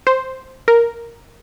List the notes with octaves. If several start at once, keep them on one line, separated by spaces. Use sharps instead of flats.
C5
A#4